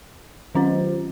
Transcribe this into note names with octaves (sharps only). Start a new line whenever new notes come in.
D#3 F#3 C#4 F4 C5